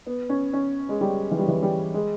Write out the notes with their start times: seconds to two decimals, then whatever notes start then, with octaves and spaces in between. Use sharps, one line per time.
0.06 B3
0.29 C#4
0.53 C#4
0.89 G#3
1.01 G3
1.31 E3
1.39 G3
1.48 E3
1.63 G3
1.94 G#3